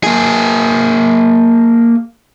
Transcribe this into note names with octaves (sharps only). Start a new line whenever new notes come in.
A#3 G#4